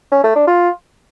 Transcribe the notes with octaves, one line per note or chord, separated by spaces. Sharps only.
C#4
A3
D4
F4